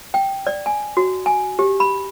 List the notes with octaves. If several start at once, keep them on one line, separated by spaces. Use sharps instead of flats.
G5
D5
G#5
F#4
G#5
G4
B5